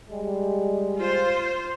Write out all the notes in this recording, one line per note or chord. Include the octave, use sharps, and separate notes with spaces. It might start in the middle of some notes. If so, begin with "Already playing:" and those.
G3 G#3
F4 C5